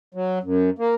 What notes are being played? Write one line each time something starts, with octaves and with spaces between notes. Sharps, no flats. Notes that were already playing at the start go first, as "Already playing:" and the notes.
F#3
F#2
A#3